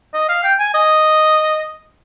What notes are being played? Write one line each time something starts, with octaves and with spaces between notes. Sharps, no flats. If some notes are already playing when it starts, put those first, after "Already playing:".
D#5
F5
G5
G#5
D#5